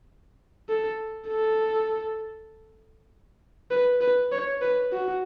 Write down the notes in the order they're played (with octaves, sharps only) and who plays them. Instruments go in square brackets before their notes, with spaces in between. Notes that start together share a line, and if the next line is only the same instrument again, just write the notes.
[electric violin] A4
A4
B4
B4
C#5
B4
F#4